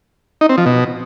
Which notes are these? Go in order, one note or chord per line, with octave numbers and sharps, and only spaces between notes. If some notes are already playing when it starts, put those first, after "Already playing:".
D#4
C4
F3
B2